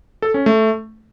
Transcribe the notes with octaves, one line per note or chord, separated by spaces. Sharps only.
A4
C#4
A3